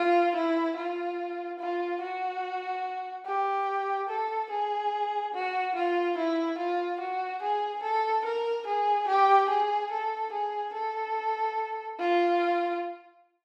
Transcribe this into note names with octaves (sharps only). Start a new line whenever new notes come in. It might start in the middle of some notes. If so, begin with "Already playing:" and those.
Already playing: F4
E4
F4
F4
F#4
G4
A4
G#4
F#4
F4
E4
F4
F#4
G#4
A4
A#4
G#4
G4
G#4
A4
G#4
A4
F4